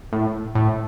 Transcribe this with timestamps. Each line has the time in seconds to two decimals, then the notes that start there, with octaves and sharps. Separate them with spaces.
0.12 A2
0.55 A2